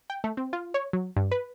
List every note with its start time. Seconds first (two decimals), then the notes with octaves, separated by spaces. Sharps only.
0.10 G5
0.24 A3
0.37 C4
0.53 F4
0.74 C#5
0.93 F#3
1.16 G2
1.31 B4